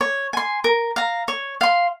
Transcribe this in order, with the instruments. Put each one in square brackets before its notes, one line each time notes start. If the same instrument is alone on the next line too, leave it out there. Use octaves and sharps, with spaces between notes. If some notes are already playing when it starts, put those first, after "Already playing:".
[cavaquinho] C#5
G#5 C6
A#4
F5 A#5
C#5
F5 C6